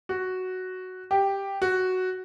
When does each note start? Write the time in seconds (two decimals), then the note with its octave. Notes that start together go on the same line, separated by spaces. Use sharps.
0.09 F#4
1.11 G4
1.62 F#4